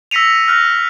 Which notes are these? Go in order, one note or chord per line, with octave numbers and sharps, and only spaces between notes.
E6 A#6 B6 C#7 D#7 F7
F6 F#6 A#6